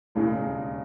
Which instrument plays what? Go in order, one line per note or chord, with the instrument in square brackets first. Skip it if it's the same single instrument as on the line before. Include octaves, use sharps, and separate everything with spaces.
[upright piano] E1 D#2 C#3 G#3 [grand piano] A2